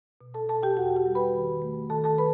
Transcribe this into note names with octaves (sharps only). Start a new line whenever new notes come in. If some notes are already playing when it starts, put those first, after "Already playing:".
B2
A4 A5
B2 A4 A5
G4 G5
E2 F#4 F#5
G4 G5
G3
B4 B5
D#3
A3
D#3 A4 A5
A4 A5
B4 B5